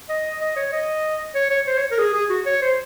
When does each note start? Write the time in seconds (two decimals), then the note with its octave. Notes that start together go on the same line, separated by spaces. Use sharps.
0.09 D#5
0.41 D#5
0.56 C#5
0.72 D#5
1.35 C#5
1.50 C#5
1.67 C5
1.77 C#5
1.91 A#4
1.98 G#4
2.13 G#4
2.29 F#4
2.46 C#5
2.61 C5